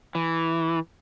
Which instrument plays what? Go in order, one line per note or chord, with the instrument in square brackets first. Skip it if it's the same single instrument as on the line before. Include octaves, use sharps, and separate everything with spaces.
[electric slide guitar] E3